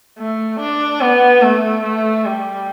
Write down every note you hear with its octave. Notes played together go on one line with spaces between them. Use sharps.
A3
D4
B3
A3
A3
G3